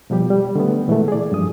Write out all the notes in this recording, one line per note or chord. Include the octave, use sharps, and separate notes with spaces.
B2 F3 G3 G4
G3
D3 A3 B3
A#2 E3 G#3 A3
G#4 D5
G2 F3 D#6